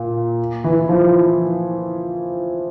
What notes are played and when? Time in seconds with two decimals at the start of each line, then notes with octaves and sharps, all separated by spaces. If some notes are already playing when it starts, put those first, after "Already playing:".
Already playing: A#2
0.64 E3
0.89 F3